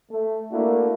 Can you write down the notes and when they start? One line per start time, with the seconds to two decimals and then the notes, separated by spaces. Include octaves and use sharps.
0.11 A3
0.52 A3 A#3 D4 E4 F#4 A#4